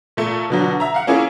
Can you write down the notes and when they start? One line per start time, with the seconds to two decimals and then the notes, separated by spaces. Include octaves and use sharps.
0.17 A#2 A3
0.50 B2 D3 F#3
0.80 E5 A#5
0.94 F5 F#5
1.07 A#3 C#4 E4 G#4